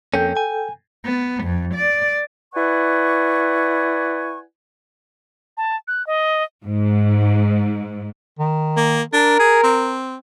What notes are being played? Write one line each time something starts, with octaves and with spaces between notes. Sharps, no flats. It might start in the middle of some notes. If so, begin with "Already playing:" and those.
F2 A#3 C#4 A4 G5 G6
G#5
B3
F2
D5
E4 B4 D5 F#5 G#5 C#6
A5
F#6
D#5
G#2
D#3
A#3
D4 A#4
G#4
C4